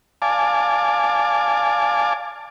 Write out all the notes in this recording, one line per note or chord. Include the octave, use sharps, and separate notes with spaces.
D5 F5 G#5 A5 D6